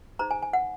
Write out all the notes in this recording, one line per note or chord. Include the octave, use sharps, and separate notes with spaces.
D#4 G#4 C5 A#5
G#5
G#5
F#5